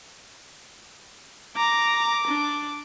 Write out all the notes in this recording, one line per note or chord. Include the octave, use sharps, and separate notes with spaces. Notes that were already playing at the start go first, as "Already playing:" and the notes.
A#5 D6
D4